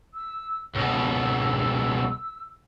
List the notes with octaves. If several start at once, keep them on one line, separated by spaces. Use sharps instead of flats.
E6
C#2 B2 E6